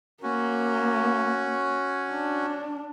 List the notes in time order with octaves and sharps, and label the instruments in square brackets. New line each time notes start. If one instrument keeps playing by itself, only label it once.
[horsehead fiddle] A#3 [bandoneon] C#4 F#4
[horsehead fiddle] D4